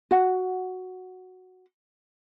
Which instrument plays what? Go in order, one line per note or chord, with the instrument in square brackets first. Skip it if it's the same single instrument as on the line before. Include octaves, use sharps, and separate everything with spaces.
[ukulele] F#4 F#5